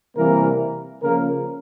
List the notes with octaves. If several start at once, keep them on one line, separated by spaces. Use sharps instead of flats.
C3 E3 G3 A#3 A#4
C#3 F3 A#3 A#4